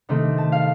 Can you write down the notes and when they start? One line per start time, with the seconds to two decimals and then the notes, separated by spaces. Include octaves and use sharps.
0.09 C3 D#3 A3 C4
0.38 A5
0.52 F5